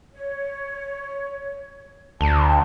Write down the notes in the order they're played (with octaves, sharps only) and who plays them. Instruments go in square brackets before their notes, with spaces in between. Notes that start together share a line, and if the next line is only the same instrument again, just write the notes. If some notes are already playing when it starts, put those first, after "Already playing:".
[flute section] C#5
[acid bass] D2 [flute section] A5